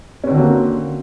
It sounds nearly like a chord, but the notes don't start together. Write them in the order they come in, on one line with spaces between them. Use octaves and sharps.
C#4 C4 D3 F#4 A#3